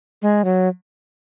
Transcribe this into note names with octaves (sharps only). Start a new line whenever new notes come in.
G#3
F#3